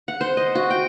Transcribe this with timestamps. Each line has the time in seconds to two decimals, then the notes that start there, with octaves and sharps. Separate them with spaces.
0.08 F#5
0.21 C5
0.37 D#5
0.55 F#4
0.70 G5